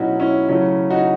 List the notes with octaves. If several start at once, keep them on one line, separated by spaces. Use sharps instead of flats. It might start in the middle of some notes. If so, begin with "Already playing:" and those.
Already playing: B2 F#3 A3 C#4 D#4 E4 F#4
C#4 E4
C#3 F#3 A3 C#4 E4
D#4 F#4